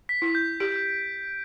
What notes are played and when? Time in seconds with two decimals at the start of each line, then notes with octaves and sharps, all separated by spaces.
0.09 B6
0.22 E4
0.35 G6
0.60 G4 D7